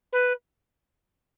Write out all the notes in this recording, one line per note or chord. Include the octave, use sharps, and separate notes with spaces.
B4